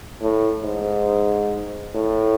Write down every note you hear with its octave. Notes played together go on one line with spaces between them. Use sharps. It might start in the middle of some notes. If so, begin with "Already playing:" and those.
A2
G#2
A2